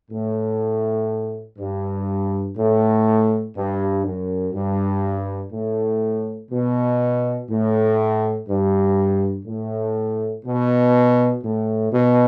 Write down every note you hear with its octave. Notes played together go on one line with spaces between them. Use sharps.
A2
G2
A2
G2
F#2
G2
A2
B2
A2
G2
A2
B2
A2
B2